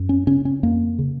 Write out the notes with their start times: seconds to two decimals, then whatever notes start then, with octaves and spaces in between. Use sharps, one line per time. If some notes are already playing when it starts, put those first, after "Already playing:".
Already playing: F#2
0.09 C#4
0.27 C#3 C#4
0.45 C#4
0.63 F2 A#3
0.99 C#3